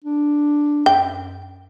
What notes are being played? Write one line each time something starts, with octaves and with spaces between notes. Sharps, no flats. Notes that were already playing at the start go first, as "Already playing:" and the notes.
D4
F#2 G5